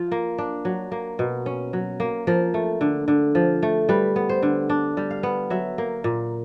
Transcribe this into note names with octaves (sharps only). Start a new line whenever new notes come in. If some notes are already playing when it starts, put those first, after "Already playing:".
Already playing: F3 F4
A#3
D4
F#3
A#3
B2
C#4
F#3
A#3
F3 A#4
A3
D3
D3
F3
A3
G3 B4
B3
C5
D3
D4
G3
F5
B3
F#3 E5
A#3
A#2